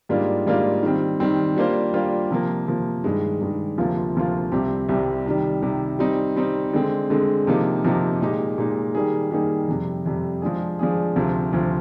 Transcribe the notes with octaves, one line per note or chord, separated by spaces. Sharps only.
G#2 G3 A#3 D4 F4
G#2 G3 A#3 D4 F4
D#3 G3 C4
D#3 G3 C4
G3 A#3 D4 F4 C5
G3 A#3 D4 F4 C5
C3 F3 A#3
C3 F3 A#3
G2 D#3 G#3
G2 D#3 G#3
D2 C3 F3 A#3 F4
D2 C3 F3 A#3 F4
C2 C3 G3 C4 G4
C2 C3 G3 C4 G4
C3 D#3 G3
C3 D#3 G3
G3 C4 D#4
G3 C4 D#4
D3 G#3 C4
D3 G#3 C4
C3 F3 A#3 D#4 G4
C3 F3 A#3 D#4 G4
A#2 G#3 D#4 G4
A#2 G#3 D#4 G4
D#3 G3 A#3 D#4 G#4
D#3 G3 A#3 D#4 G#4
F2 C3 G3
F2 C3 G3
F3 G#3 D4 G#4
F3 G#3 D4 G#4
D2 C3 F3
D2 C3 F3